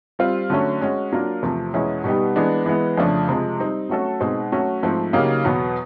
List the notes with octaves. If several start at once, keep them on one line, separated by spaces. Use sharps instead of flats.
G3 C4 F4
D3 F#3 A3 C#4
G#3 C#4 F#4
F#3 A#3 D4 F4 A#4
E2 C3 F3 A3
E2 B2 G#3 C#4 E4
B2 G3 B3 D#4 G4
E3 G#3 B3 D4
E3 G#3 B3 E4
F2 C#3 F3 A3 D4
C3 F3 G#3
G3 C4 D#4
F#3 A3 C#4 F#4 A4
B2 G#3 C4 D#4
F#3 A3 C#4 F#4
G#2 F3 A3 C4
C#3 F#3 A#3 D#4 G4
E2 B2 F#3 B3